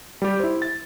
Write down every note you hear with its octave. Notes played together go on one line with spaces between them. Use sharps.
G3 G4
E4 C5
A6